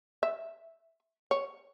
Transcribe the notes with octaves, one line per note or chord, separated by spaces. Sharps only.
E5
C#5